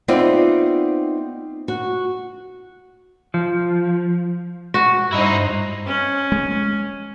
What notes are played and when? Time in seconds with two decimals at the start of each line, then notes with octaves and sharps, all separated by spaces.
0.08 B3 C4 D#4 F4 D5 E5
1.68 F#4
3.34 F3
4.74 F#4
5.12 G2 D#4 E4 C5 D#5
5.87 C#4
6.32 G#3